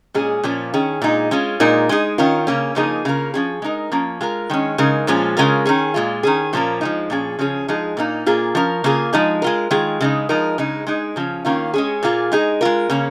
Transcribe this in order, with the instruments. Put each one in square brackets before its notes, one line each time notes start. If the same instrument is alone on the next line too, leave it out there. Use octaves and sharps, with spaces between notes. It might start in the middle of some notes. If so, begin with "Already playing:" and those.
[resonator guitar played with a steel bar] A#2 G#3 C#4 G#4
A#2 F3 A#3 C#4
D#3 C#4 G#4
A#2 G#3 D#4
G#3 C#4 F4
A#2 G#3 D#4 A#4
G#3 D#4 G#4
D#3 C#4 F4 A#4
C#3 A#3 C#4
C#3 F3 A#3 D#4 G#4
C#3 A#3 F4 A#4
F3 C#4 G#4
G#3 D#4 A#4
F3 A#3 C#4
G#3 F4 A#4
D#3 G#3 C#4
C#3 G#3 D#4 A#4
A#2 F3 G#3 C#4
C#3 G#3 C#4 F4 A#4
D#3 C#4 G#4
A#2 G#3 F4
D#3 C#4 G#4
A#2 F3 A#3 C#4 A#4
F3 G#3 D#4
A#2 F3 C#4 G#4
C#3 F3 C#4 G#4
F3 G#3 D#4 G#4
A#2 A#3 D#4
A#2 A#3 F4 G#4
F3 C#4 A#4
C#3 A#3 F4 G#4
F3 G#3 D#4 G#4
G#3 F4 A#4
D#3 G#3 F4 G#4
C#3 G#3 D#4
F3 G#3 D#4 A#4
C#3 G#3 D#4
G#3 D#4 G#4
C#3 F3 C#4
D#3 A#3 C#4 F4
G#3 C#4 G#4
A#2 A#3 F4 G#4
G#3 D#4 G#4
G#3 F4 A#4
C#3 A#3 C#4